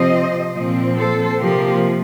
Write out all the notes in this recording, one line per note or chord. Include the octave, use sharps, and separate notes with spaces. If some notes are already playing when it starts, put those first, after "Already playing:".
Already playing: C3 F3 C4 C5 D#5
A#2 F3 C4
A4 C5
C3 F3 A#3 G4 A#4